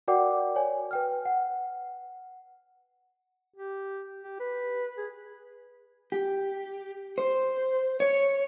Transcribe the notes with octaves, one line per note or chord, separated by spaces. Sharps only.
F#4 A#4 D5 F#5 G5 D6
C#5 D5 G#5
B4 G5 F6
F#5
G4
G4
B4
G#4
G4
C5
C#5